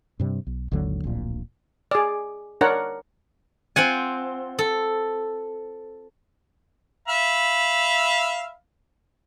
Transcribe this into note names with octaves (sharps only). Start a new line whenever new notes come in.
G2 C3 G3
B1
G#1 D#2 D3 F#3
D1 A#1 A#2
G#4 D5
D4 A#4 C#5 F#5
C4 F4 F#5 G#5
A4
E5 F5 B5